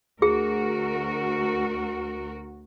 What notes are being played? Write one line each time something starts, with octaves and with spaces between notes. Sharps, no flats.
D2 F#4 G#4 A#4